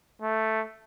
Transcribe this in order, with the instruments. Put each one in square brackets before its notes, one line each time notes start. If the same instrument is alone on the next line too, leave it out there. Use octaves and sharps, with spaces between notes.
[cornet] A3